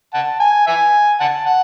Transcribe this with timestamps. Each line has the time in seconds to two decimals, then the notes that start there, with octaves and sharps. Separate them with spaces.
0.14 F#5 A5
0.40 G#5
0.67 E5 G#5
1.20 F#5 A5
1.46 F#5